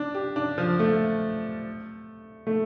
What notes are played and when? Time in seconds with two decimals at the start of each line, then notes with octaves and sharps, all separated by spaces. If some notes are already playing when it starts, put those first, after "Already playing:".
Already playing: D4
0.15 G4
0.36 D4
0.58 F3
0.79 A3
2.47 A3